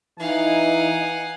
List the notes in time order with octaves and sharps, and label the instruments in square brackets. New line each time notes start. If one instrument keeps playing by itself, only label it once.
[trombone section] E3 E4 [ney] D#4 [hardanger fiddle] F5 F#5 [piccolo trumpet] G#5